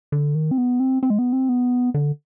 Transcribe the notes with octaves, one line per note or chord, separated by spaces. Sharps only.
D3
D#3
C4
B3
C4
C4
G#3
B3
C4
B3
D3